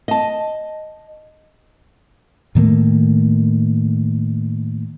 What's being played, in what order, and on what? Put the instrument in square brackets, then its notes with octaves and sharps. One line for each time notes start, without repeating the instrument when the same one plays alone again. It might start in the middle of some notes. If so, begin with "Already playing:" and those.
[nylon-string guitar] D#5 A5
[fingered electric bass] A2 D#3 A3 A#3